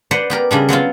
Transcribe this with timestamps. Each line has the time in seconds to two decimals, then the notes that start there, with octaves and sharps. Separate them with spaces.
0.11 B4 C5 D5 F#5
0.30 B3 G4 A#4
0.51 C#3 G3 D4
0.69 F#3 B3 C4 F4